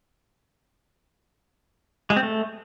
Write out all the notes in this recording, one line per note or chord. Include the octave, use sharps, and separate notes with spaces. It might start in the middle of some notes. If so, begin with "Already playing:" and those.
G#3
C4
A3